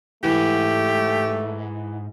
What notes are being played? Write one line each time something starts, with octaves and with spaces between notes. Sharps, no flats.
C#2 G#2 E3 A3 G4